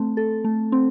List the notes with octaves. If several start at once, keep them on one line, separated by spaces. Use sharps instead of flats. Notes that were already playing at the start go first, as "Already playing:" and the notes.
Already playing: A3 C4
A4
A3
C4